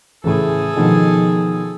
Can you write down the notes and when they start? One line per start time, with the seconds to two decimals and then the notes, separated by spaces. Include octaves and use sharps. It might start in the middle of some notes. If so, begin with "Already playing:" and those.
0.24 A2 C#3 E3 G#4 A4
0.77 B2 D#3 F3